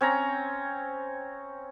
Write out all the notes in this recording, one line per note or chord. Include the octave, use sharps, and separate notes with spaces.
C4 C#4 C#5 A#5